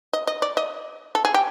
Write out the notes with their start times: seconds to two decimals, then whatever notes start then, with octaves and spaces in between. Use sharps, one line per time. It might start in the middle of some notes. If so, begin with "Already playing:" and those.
0.13 D#5
0.27 D#5
0.42 D5
0.57 D#5
1.15 A4
1.25 G#4
1.34 G4